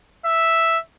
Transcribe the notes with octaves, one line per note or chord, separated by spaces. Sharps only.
E5